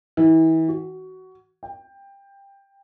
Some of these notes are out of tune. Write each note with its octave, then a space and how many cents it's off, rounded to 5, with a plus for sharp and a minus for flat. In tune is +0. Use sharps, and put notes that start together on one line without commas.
E3 -35
F#4 +15
G5 +15